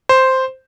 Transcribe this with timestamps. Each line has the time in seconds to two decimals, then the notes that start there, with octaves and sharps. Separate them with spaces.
0.09 C5